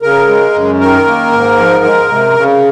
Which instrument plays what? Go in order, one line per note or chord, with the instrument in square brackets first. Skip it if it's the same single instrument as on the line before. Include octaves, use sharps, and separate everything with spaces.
[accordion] C#3 A#4
G#3
F#2
D#3 A#4
A#3
G#2
F3
G#3
C3
C#3